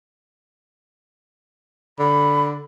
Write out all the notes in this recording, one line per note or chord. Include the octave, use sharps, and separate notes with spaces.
D3 B5